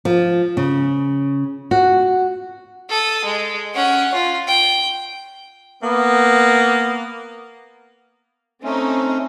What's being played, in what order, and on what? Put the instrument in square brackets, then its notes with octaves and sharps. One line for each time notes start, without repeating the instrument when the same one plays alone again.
[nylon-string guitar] F3
C#3
F#4
[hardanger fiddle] A4 D#6
G#3
C#4 F#5
F4
G5
[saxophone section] A#3 B3
[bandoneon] A3 C#4 [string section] C4 D#4